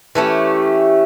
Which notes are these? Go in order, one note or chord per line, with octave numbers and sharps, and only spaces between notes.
E3 A3 C#4 G4